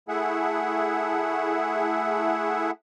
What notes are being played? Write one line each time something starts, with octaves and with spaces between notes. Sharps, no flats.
A3 E4 G#4 E5 F#5